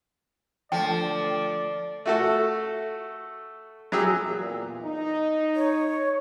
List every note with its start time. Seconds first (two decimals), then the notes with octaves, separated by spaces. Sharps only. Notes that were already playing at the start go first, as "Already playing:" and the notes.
0.72 D3 F3 A3 D5 G5
2.05 A3 F#4 A4
3.92 F#3 G4 G#4 E6
4.26 E2 A#2
4.83 D#4
5.56 C#5